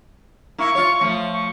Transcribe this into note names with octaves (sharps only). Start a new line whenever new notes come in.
A#3 E4 C#6
F4 C#5
F3 A3
C#6